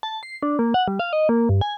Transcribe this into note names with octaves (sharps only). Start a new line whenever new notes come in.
A5
C7
D4
A#3
F#5
G3
F5
D#5
A#3
G2
G#5